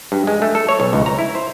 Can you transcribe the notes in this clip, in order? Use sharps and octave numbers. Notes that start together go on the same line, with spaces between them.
G2
G#3
A3
A4
C#5
B1
C#2
A#5
E4
C5